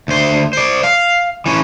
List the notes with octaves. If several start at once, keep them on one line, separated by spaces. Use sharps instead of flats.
D2 C5
C5 D5
F5
E3 C#4